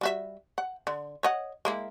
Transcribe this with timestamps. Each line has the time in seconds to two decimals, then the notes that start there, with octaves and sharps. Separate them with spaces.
0.01 G3 F#4 E5
0.58 F#5
0.87 D3
1.23 C#5 D#5 F#5
1.65 G#3 A#3 E4